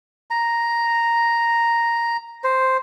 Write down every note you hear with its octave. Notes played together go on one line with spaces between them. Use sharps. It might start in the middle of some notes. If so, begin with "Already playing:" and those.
A#5
C5